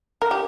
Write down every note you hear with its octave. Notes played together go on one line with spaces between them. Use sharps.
A#4
G4